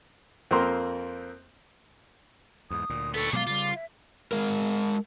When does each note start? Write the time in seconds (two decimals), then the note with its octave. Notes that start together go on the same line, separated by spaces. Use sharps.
0.51 F2 A#3 C4 A#4 C6
2.70 E2 G#2 D#6
2.90 D2 A#2
3.14 B3 A4 C#5
3.33 B2 F#3 G#3 F4 G#4 D6
3.47 C#3 G3 F4
3.75 E5
4.32 G#3 A#4